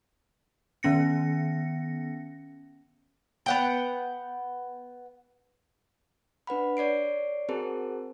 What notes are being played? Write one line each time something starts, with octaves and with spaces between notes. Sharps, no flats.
D#3 B3 C#4 A#6 C#7
B3 F#5 G5
D4 B4 F#5 B5
C#5 D5 C7 D7
C4 F#4 G#4 A#4 C5 A5